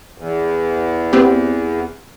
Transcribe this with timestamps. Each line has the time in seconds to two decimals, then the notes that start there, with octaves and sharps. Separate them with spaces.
0.18 E2
1.13 B3 C4 G4